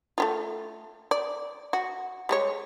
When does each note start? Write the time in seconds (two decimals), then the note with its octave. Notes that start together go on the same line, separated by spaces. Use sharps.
0.18 A3 E4 F4
1.11 D5
1.73 F#4
2.29 G3 G#3 C#5